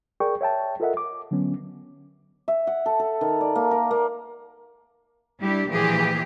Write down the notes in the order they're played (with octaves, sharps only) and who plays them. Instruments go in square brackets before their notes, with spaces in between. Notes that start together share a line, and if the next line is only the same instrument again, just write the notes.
[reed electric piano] G#4 A#4 D5 G5 C#6
C#5 E5 G5 A5
F4 A4 A#4 D#5 E5 F#5
D6
D3 F#3 B3 C#4
[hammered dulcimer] E5
F#5
A4
A4
D#3
D5
A#3
A#4
A#3
[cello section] G3 D4 E4 G4
A#2 E3 F3 G4 G#4